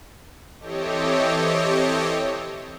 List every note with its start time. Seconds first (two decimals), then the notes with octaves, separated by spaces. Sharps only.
0.59 E3 C4 G4 A4 C#5 D#5